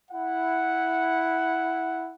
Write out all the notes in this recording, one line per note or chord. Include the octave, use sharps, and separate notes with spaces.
E4 F#5